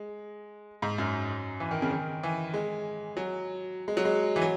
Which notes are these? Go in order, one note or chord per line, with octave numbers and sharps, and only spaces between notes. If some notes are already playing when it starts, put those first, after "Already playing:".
Already playing: G#3
G#2
F#2
E3
D#3
C#3
D#3
E3
G#3
F#3
G#3
F#3
G#3
E3
F#3